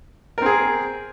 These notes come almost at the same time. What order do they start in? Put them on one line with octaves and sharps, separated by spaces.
A#4 C4 G#4